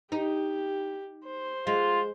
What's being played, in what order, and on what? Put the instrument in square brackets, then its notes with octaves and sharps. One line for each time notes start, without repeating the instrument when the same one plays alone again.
[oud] D#4 [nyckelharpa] G4
[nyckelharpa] C5
[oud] G#3 [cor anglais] F4